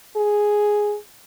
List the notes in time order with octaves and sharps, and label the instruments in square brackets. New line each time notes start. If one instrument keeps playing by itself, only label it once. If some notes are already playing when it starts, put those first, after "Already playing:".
[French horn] G#4